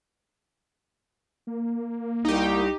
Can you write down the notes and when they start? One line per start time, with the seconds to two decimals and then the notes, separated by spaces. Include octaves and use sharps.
1.47 A#3
2.25 C2 D#4 G4